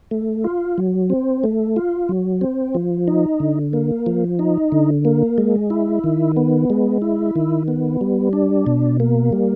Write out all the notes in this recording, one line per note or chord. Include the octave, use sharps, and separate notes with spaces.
A3
F4
F#3
C4
A3
F4
F#3
C4
F3
D#4
D3
A#3
F3
D#4
D3
A#3
G#3
E4
D#3
B3
G#3
E4
D#3
B3
G3
D4
B2
A#3
G3